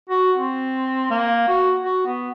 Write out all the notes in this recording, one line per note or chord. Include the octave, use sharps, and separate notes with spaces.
F#4
C4
A#3
F#4
F#4
B3